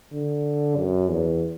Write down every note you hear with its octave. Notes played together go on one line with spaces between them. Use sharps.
D3
F#2
E2